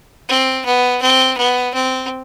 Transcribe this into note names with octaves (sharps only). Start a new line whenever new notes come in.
C4
B3
C4
B3
C4